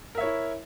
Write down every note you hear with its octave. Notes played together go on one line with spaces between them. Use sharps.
E4 A#4 C#5 E5